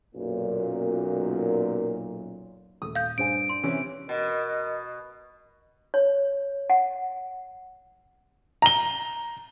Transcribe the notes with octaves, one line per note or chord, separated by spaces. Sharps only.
B1 F#2 A#2
D#1 A3 D#6
F5 G6
G2 C5 G#5 D7
D4 C6
C3 E3 C#4
B2 A#4 D#5
C#5
F#5
A#5 G7